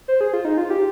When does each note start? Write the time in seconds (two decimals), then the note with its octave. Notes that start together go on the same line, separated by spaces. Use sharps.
0.08 C5
0.21 G#4
0.33 F4
0.45 D#4
0.58 F4
0.70 G4